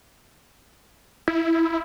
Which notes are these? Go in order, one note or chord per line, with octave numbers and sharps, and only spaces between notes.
E4